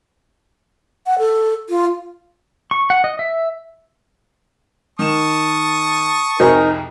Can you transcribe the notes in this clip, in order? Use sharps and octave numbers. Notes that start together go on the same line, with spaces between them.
F#5
A4
F4
C#6
F#5
D#5
E5
D#3 A5 C#6 D#6 E7
C2 F2 D#4 F#4 G#4 A#4 C5 D#5